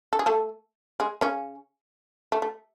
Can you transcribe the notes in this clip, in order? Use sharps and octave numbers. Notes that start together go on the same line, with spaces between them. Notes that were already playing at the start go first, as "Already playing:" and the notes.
A4
G#4
A3 A4
G#3 G#4
C#3 C#4
A3
A3